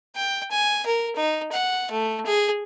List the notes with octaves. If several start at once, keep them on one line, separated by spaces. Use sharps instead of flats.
G5
G#5
A#4
D#4
F#5
A3
G#4